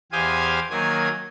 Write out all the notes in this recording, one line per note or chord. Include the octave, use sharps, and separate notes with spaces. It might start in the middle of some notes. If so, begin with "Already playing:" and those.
E2 G4 C5 F5 G#5 D#6
D#3 F#3 A#3 G#5 D#6